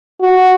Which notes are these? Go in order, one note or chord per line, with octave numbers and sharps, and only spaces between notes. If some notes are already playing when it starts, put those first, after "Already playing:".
F#4